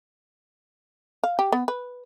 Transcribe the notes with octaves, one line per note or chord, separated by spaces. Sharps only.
F5
G4
B3
B4